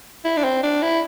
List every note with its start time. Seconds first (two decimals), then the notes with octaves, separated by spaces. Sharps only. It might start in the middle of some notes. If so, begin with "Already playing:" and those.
0.25 E4
0.37 D4
0.44 C4
0.63 D4
0.82 E4